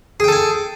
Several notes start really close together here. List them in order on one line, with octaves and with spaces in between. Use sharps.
G#4 G5 A4 G#5